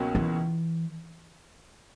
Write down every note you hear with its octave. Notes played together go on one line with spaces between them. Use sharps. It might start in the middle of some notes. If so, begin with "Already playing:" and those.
Already playing: C#2 B2 F#3 A#3 C#4
E3